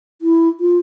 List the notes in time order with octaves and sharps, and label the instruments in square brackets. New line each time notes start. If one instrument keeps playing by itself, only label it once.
[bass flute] E4
F4